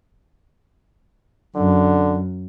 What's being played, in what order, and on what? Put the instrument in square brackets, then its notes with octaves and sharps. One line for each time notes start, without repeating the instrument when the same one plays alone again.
[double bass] F#2 [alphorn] D3